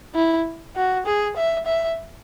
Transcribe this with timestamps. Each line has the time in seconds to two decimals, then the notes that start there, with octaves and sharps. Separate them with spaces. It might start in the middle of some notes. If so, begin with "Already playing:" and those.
0.15 E4
0.76 F#4
1.06 G#4
1.36 E5
1.66 E5